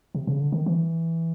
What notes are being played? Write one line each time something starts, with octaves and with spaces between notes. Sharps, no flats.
C3
C#3
D3
D#3
E3